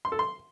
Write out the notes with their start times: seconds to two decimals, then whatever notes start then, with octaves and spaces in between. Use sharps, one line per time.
0.05 C6
0.12 A4
0.19 C6